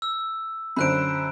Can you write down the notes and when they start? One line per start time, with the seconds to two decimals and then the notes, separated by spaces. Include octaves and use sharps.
0.02 E6
0.76 F#2 D3 C5 B5 F#6 D7